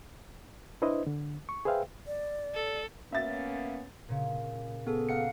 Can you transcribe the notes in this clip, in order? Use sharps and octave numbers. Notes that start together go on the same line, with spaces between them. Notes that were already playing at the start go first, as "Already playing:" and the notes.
D4 E4 B4 C5 D#5
D3
C#6
G#4 B4 C5 E5 F5 G5
D5
A4
A#3 B3 C#4 E5 A6
A#2 C#3
B3 G#4 A4
A#3 F5 F#5 C#7